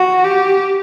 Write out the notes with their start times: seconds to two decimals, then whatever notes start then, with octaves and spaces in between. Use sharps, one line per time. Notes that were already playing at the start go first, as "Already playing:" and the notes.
Already playing: F#4
0.24 G4